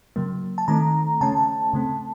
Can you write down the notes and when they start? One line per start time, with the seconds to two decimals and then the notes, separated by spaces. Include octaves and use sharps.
0.16 C#3 F#3 A#3
0.58 A5
0.68 D#3 A3 C4 D#4 A#5
1.21 C#3 A3 C#4 A5
1.73 C#3 A3 C4